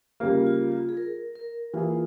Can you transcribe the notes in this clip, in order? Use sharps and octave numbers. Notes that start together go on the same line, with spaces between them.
C#3 G3 A#3 F4
F4
F4
G#4
A#4
A#4
E3 A#3 E4 F4 G#4